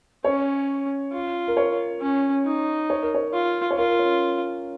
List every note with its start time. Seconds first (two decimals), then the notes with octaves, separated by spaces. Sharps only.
0.24 C#4 C#5
1.13 F4
1.48 A#4
1.57 C#5
2.01 C#4
2.45 D#4
2.90 C#5
3.02 A#4
3.14 C#5
3.33 F4
3.71 C#5
3.78 F4 A#4
3.99 C#4